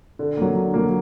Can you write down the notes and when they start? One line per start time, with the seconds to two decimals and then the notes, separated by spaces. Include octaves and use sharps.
0.19 D3
0.37 F#3 A#3
0.56 D3
0.74 F#3 A#3